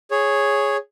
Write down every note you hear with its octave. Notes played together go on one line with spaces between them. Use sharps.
G#4 C#5